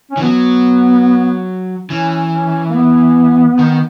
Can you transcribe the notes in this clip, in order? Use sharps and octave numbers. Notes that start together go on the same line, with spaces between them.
C#4
E3
F#3 B3
E3 C#4
C#4
A#3
B3
D#3